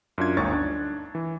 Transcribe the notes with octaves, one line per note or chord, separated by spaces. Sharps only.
F#2 D4 F4 G#6
G1 D2 D#4 C#5 C#6 A6
D4
E3